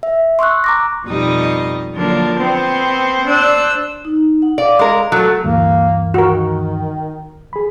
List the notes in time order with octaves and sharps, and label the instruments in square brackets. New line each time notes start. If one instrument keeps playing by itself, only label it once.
[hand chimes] E5
C6 C#6 E6 F#6
A#5 D6 A#6
[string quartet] F2 B2 G3 D#4 D#5
D3 F3 F#3 A#3 D4 A#4
B3 C4 C5
D4 C5 D5 E6 F#6
[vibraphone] D#4
F#5
[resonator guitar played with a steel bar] D5 [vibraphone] F5
[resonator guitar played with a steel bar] G#3 A#4
[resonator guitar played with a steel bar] F#3 A3 [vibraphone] F#4 A4
[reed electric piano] D2 G2 E3 [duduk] A#3
[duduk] D#3 [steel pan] F#4 A#4
[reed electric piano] G#4 B5